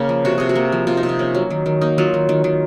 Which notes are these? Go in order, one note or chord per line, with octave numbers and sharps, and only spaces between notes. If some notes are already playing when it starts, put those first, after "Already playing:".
Already playing: C#3 A#3
F3
C3 F#4
C3 G#4
F#4
A#3
F3
C3 F4
D#4
C3
F4
A#3 C#4
F#3
D#3
D#3
A#3 D#4
F#3 F4
D#3
D#3
D#3